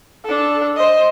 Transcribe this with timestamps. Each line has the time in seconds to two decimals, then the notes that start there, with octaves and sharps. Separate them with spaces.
0.25 D4 A4
0.76 C5 D#5